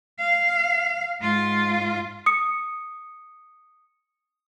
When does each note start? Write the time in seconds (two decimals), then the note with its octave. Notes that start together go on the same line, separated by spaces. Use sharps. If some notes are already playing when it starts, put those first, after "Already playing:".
0.19 F5
1.21 G#2 F4
2.26 D#6 C#7